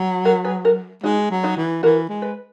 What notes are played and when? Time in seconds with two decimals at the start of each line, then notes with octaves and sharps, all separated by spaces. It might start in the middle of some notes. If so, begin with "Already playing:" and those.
Already playing: F#3
0.25 F#4 A#4
0.44 G#4 B4
0.65 F#4 A#4
1.04 G#3 D#4 F#4
1.31 F#3
1.44 D#4 F#4
1.57 E3
1.83 E3 F#4 A#4
2.09 G#3
2.22 B4